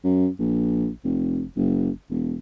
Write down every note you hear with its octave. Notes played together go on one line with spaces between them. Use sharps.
F#2
A#1
F1
F#1
E1